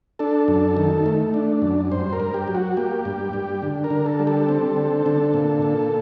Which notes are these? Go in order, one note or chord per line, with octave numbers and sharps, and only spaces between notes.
D4 A4
F#2
D#3
A3
D4
F#2
G2 C5
A#4
G2
G4
F#3
F#4
A#3 G4
G2
G2
D3
A#4
D3
A4
G3
A4
C4
D3
D3
A#2
A#2